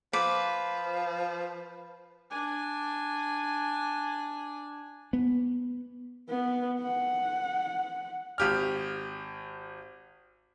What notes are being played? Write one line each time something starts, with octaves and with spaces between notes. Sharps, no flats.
F3 B4 D6
D4 G#5
B3
B3
F#5
G#1 G4 F6